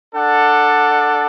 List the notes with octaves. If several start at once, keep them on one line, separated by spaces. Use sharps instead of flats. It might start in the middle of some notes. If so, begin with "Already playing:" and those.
D4 A4 D5 F#5